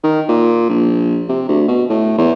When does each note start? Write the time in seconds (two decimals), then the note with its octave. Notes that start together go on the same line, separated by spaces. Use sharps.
0.03 D#3
0.28 A#2
0.69 A#1
1.29 C3
1.49 D2
1.68 B2
1.89 A2
2.18 E2